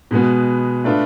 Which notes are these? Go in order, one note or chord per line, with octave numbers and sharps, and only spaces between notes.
B2 G#3 B3
A3 D4 F4 B4